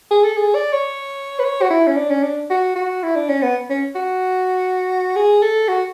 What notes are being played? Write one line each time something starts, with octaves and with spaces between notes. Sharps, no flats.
G#4
A4
G#4
D5
C#5
B4
C#5
F#4
E4
C#4
D4
C#4
D4
F#4
F#4
E4
D4
C#4
B3
C#4
F#4
G#4
A4
F#4